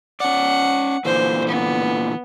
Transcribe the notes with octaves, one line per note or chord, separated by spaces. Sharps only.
C#4 D5 F#5
A#2 D3 E3 C5
B3